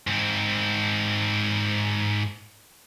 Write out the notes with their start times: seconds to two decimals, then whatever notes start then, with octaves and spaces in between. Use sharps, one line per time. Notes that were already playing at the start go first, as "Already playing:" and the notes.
0.07 G#2 C4